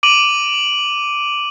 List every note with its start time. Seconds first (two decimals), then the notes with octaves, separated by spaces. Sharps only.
0.03 D6 D7 D#7 F#7